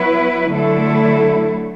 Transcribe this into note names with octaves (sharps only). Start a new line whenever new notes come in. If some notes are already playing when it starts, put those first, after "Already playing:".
Already playing: F#3 B3 E4 B4
D3 F#3 A3 E4 A4